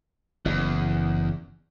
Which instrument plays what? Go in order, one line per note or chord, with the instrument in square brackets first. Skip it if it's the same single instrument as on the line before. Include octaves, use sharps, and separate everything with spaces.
[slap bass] F#1 [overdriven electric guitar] E2